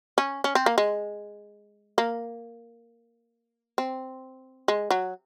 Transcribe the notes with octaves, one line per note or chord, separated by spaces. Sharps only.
C#4
C#4
C4
A#3
G#3
A#3
C4
G#3
F#3